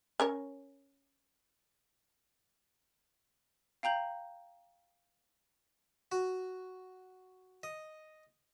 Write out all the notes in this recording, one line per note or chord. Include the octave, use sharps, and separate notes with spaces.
C#4 A#4 C#5
F5 G5 A#5 G6 F#7
F#4
D#5